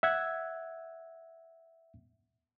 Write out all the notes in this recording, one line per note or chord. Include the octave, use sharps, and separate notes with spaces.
E5 F#5 G#6